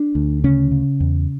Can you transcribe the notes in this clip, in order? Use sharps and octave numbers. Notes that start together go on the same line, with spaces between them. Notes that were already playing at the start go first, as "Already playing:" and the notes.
Already playing: D4
D2
C#3 C#4
C#3
E2